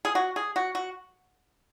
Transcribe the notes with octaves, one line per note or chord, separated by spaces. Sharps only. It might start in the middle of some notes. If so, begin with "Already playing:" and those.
G#4
F#4
G#4
F#4
F#4